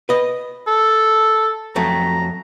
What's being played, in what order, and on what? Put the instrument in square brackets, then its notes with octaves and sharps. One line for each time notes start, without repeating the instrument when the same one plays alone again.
[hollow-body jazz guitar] B4 D#5
[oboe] A4
[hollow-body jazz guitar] F2 F#3 A3 [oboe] A#5